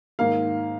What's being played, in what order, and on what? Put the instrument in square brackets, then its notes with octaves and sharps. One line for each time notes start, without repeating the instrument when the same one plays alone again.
[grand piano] G#2 D#3 A#3 F5